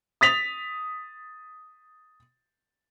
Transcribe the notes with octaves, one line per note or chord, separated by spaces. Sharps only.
D#6 A6 B6 F7